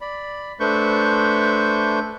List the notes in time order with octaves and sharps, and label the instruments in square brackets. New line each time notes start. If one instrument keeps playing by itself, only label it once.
[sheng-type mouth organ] D5 B5
A3 D4 B4 C5 C#6 G6